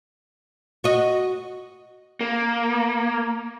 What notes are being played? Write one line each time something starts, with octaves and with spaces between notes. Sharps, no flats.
F#4 D#5
A#3